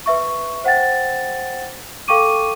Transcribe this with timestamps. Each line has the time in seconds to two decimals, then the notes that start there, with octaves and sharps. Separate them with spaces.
0.06 B4 E5 C#6
0.64 C5 F#5 G5 A6
2.08 A4 F5 G5 C#6 D6 D#7